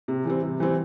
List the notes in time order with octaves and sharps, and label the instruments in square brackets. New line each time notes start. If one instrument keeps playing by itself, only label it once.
[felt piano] C3
E3 G3 C4
C3
E3 G3 C4